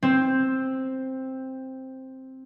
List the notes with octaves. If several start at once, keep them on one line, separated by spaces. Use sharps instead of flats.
C4 C5